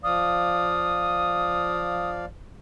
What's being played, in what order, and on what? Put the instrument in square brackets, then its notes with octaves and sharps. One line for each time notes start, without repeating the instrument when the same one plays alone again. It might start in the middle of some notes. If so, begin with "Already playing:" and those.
[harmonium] F3 D5 F5 [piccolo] D#6